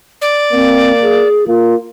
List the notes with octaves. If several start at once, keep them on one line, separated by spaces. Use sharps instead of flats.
D5
A#3 C4
G#4
A#3 F4